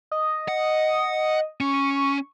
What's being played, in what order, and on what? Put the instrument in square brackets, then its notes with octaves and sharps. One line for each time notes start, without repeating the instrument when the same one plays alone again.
[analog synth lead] D#5
[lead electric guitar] F#5
[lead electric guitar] C#4 [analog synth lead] C#6